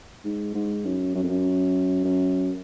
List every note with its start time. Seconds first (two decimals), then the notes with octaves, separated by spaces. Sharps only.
0.24 G#2
0.54 G#2
0.85 F#2
1.15 F#2
1.23 F2
1.29 F#2
2.04 F#2